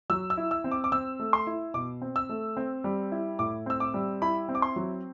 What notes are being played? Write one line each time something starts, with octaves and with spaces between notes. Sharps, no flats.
F#3 E6
E6
E4
E6
C4
D6
D6
C4 E6
A3
C6
E4
B2 D6
C4
E6
A3
C4
G3
E4
A2 D6
C4 E6
D6
G3
E4 B5
C4
D6
C6
F#3